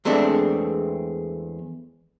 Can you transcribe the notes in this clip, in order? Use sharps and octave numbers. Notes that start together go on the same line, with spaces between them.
E2 G#3 A3 C4 D4